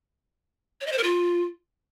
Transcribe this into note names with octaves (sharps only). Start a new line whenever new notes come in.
C#5
D#5
C5
A#4
F4